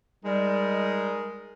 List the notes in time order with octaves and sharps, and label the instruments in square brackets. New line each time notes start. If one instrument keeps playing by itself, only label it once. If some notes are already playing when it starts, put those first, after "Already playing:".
[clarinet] G3 [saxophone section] G#3 D#4 A#4